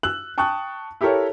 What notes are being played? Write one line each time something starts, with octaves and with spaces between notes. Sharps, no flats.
E6 F#6 F#7
G5 A5 C#6 D#6 F#6
E4 G4 A4 A#4 C#5